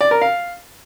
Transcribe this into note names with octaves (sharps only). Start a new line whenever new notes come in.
D5
A#4
F5